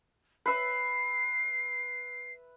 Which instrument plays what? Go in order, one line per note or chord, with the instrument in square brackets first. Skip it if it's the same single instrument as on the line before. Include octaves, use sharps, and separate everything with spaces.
[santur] B4 E5 [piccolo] C7